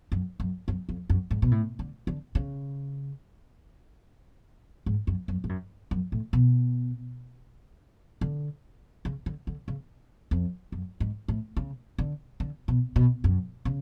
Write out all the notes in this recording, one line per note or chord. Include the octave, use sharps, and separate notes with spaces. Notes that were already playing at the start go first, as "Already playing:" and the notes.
F#2
F#2
F#2
F2
F#2
G#2
B2
A2
D3
D3
C#3
G#2
F#2
F#2
G#2
F#2
F#2
A2
B2
D3
C#3
D3
D3
C#3
F2
F#2
G#2
A2
C#3
D3
D3
B2
B2
F#2
C#3